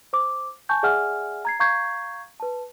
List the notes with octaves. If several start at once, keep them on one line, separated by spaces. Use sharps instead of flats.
C5 D6
G#5 A5 C#6 G6
G#4 D5 E5 F#5 G#5 F6
A#5 G#6 C7
F5 A#5 C#6 G6 G#6 C7
B4 A5